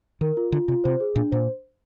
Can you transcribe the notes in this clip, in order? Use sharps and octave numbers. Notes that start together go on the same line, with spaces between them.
D#3 A#4
F4
D3 F4
C3 F4
C3 C5
G#4
A#2 D4
A#2 C5